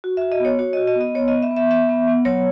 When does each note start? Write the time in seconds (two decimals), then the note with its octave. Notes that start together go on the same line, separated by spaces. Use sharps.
0.04 F#4
0.17 F#4 E5
0.32 D#5
0.40 B3 C#5
0.59 F#4 C#5
0.73 F#4 D#5
0.87 D#5
0.96 B3
1.01 D#5
1.15 B3 C#5
1.28 D#5
1.33 B3
1.42 E5
1.51 B3
1.57 E5
1.71 B3 E5
1.89 B3
2.08 B3
2.25 F#3 C#5